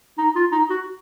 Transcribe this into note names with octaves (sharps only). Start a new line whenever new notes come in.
D#4
F4
D#4
F#4